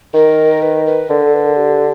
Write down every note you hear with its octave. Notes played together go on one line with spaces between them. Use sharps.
D#3 A#4
B4
B4
D3 A#4
A4
B4
A#4
G4